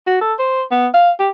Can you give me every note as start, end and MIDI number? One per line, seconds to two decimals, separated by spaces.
0.07 0.19 66
0.21 0.33 69
0.39 0.62 72
0.71 0.87 59
0.94 1.11 77
1.20 1.29 67